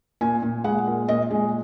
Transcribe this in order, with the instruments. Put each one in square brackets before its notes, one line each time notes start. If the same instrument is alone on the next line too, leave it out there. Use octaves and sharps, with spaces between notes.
[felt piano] A#2 G#5
A#2
G#3 F#5
A#2
A#2 D#5
G#3